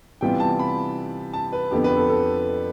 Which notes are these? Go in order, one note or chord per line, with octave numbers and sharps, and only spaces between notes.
C3 E3 G3 B3 F4 G5
A5
B5
A5
B4
F2 D3 F3 B3 G4
B4
A4
A4